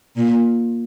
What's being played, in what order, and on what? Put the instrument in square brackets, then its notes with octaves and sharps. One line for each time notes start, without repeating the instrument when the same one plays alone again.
[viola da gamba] A#2